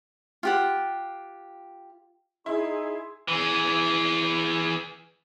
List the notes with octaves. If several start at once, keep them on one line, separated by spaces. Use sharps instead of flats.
F4 G4 F#5
D#4 E4 G#4 C6
E3 G#4